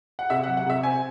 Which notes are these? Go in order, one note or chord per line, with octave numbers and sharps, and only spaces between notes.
F#5
C3 E5
F#5
F#3
F#5
C3 E5
C4 G#5